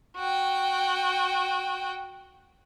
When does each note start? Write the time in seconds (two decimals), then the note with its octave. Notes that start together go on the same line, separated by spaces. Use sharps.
0.17 F#4 G5